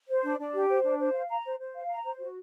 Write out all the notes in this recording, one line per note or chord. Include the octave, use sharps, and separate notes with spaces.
C5
D4
D4
G4
C5
D4
C5
F5
A#5
C5
C5
F5
A#5
C5
F#4